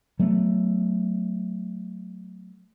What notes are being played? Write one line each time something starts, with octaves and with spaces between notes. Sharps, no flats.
F#3 A3 B3